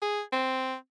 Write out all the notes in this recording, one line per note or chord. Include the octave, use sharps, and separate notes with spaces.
G#4
C4